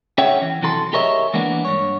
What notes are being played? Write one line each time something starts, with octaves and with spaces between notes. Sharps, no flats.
C#4 G#4 C#5 E5 F#5 G5
E3
C3 E3 F#3 A4 B5 C6
G4 G#4 A#4 C#5 D#5 E5
E3 G#3 A#3 B3 D4
G2 C#5